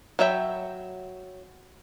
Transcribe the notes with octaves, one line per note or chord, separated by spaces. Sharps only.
F#3 C#5 E5 G5 B5